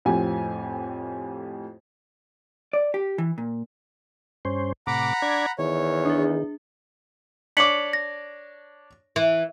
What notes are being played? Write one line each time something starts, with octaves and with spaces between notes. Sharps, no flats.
F2 A2 F3 C4 G4 G#5
D5
G4
E3
A#2
G2 C#4 C5
A2 C3 F#5 A#5 B5 D6
D4 D5 G#6
E2 D#3 C#5
D4 G#4
D4 C#5 D6 B6 C#7 F#7
A#6
E3